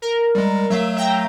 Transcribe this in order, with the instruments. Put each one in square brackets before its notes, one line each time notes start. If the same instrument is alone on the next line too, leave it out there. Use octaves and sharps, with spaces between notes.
[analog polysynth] A#4
[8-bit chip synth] G3 G#3
[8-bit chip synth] F#3 A3 F5 [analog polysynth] E5
[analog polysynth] E5 G5 A#5